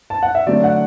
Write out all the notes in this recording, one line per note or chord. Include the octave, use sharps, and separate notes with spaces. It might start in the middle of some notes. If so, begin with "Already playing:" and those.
A5
F#5
E5
D3 F#3 A3 D5
F#5